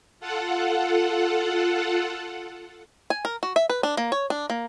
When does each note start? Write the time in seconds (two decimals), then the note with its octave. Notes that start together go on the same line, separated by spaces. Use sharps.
0.20 F4 A4 F#5
3.10 G#5
3.25 A#4
3.43 F#4
3.56 E5
3.69 B4
3.83 D4
3.97 A#3
4.12 C#5
4.30 D4
4.50 A#3